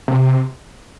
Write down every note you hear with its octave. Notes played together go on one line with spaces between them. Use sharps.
C3